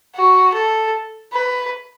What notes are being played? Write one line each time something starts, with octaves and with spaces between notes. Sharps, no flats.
F#4
A4
B4